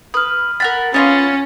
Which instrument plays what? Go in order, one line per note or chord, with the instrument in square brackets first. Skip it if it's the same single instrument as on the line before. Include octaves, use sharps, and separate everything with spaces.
[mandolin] B4 [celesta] D#6 F6
[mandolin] A#4 F#5 B5 [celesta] A6
[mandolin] B3 D#4 F4 [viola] C#4 [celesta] A6